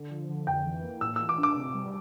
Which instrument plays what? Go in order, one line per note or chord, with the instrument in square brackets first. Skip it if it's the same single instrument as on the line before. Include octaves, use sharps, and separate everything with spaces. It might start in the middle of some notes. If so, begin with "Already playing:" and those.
Already playing: [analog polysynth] D3
F3
D3
[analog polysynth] F2 [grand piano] G5
[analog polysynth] E3
A#3
[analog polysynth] A2 [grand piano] E6
[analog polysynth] E3 [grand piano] E6
[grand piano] D6
[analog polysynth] D4
[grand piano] D6
[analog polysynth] C3
G3